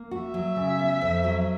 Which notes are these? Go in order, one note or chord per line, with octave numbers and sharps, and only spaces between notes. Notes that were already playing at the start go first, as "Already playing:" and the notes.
Already playing: A#3
F#4
E5
F#3
C#3
B3
F2
F#3